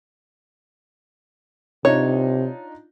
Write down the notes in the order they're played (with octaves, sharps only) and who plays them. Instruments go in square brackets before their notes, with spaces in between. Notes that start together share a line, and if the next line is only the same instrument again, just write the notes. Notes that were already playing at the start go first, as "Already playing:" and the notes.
[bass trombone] C3 [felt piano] D4 D#4 F4 [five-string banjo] C#5